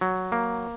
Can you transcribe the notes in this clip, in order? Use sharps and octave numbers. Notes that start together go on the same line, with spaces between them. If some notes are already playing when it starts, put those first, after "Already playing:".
F#3
A#3